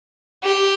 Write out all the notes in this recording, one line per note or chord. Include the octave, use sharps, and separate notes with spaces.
G4